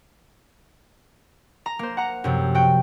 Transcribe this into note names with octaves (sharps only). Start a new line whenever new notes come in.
A#5
A#3 C5
F#5 A#5
F#2 C3 F3
F#4 G5